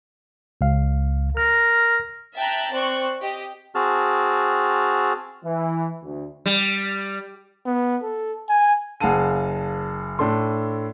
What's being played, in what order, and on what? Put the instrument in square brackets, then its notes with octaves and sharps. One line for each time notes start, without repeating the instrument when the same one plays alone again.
[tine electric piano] C#2 F5
[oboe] A#4 [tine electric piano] F6
[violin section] E5 G5 A5 A#5 F#6
C4 D5 C#6 F#6
G4 D#5
[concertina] C4 F#4 G#4 A5 F6
[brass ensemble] E3
D2
[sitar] G3
[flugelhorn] B3
A4
G#5
[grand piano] F#1 G#4 F5 F#5 A5 D#7
A2 D4 A4 C6